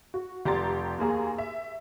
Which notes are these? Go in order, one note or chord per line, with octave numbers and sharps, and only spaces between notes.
F#4
F1 G4 D5 A#5 C6 A6
D#2 A#3 G#4 A#5
E5